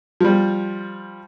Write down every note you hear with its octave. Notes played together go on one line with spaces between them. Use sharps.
F3 G3